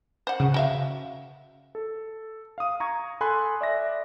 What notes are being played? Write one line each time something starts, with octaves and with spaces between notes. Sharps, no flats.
C5 F#5
C#3
F#4 E5 F5
A4
F5 D#6
A#5 C#6 G#6
A4 G#5 B5 C6 F#6
D5 E5 D6 A#6